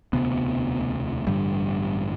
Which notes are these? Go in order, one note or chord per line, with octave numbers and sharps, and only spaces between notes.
E1 D2 C3 B3
A1 G2 D3 G3